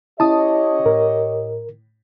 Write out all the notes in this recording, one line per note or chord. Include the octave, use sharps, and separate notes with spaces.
C#4 E4 G4 C#5 D#5 A5 D#6
A2 A#4